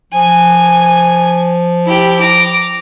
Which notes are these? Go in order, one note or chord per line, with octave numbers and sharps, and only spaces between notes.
F3 G#5
E4 G4
A#5 D6